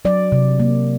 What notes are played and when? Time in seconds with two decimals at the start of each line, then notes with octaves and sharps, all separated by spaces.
0.05 F#3 D5
0.32 C3
0.60 A#3